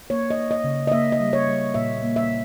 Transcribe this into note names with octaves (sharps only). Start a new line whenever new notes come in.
A#3 C#5
D#5
A#3
D#5
C#3
D#5
A#3 E5
D#5
G3
C#5
G3
A#2 E5
A#3
E5